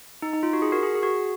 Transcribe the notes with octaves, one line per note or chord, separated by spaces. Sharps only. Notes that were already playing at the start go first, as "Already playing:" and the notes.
D#4
D#4
F4
F#4
G#4
F#4 A#4
G#4
G#4
F#4